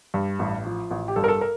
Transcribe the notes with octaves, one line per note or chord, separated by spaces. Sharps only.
G2
A1
F3
A1
G4
G2 A4
A#4
A4
A#4